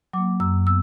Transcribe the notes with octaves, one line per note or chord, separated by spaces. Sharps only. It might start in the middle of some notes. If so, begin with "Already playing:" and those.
F#3 A#3 D6
F#2 E6
B3 E6